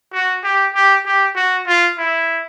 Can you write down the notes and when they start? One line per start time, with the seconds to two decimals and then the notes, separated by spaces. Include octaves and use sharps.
0.13 F#4
0.44 G4
0.74 G4
1.06 G4
1.36 F#4
1.67 F4
1.98 E4